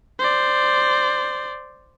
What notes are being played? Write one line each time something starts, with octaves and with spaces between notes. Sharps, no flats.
C5 D5